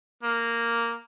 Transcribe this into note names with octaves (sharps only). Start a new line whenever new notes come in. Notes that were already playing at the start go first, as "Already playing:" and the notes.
A#3